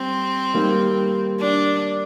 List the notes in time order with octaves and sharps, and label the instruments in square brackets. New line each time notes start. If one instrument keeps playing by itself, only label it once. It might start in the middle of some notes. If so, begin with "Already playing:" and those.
Already playing: [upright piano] G3 [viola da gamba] C4
[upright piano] D#3 G3 A#3
[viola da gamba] D4